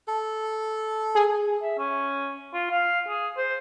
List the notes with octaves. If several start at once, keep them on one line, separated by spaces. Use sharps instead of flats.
A4
G#4
E5
C#4
F4
F5
G#4
C5